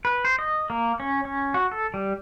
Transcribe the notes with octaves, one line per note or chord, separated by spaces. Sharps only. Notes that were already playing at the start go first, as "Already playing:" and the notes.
B4
C5
D#5
A#3
C#4
C#4
F#4
A4
G3